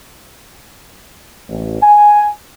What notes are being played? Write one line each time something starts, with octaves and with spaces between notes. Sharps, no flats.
A1
G#5